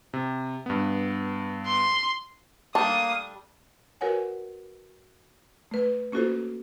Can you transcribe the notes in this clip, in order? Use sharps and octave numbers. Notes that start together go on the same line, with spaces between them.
C3
G2 B3
C6
G3 A3 A#3 D4 F5 A5 D#6
F#4 A#4 B4 C#5 F#5 G#5
A3 B4
A#3 C#4 F4 F#4 A4 C5